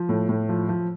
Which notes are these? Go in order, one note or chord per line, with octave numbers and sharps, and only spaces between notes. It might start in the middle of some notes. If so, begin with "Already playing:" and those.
Already playing: F3
A2
A2
F3
F3